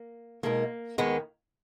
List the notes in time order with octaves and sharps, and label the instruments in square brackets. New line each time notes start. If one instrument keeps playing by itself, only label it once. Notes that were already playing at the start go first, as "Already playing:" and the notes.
Already playing: [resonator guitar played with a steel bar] A#3
[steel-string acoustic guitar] B2 G#3 D#4 A#4 [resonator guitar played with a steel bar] A#3
[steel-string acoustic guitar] D#2 D#3 A#3 [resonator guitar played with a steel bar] G#3 B3